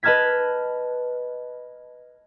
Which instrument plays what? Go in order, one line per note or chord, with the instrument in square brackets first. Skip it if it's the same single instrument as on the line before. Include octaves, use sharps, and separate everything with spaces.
[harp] B4 D#5 A5 F6 G#6 B6